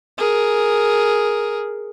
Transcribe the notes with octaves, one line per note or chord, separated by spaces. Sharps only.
G#4 A#4